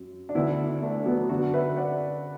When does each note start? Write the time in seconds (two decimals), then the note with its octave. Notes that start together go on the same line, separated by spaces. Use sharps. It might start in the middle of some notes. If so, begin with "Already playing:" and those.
Already playing: F#2
0.29 D4
0.35 D2 D3 B3 E4
0.82 A3 D4
1.06 F#3 B3
1.29 F#2 D3 D4 F#4
1.54 B4 E5
1.77 D5 F#5